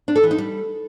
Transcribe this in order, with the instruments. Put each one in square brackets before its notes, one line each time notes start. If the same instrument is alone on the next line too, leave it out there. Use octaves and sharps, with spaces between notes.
[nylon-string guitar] D4
A4
E3
D#4
G3